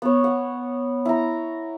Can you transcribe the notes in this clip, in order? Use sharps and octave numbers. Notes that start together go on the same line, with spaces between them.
B3 C#5
F#5
E4 A#5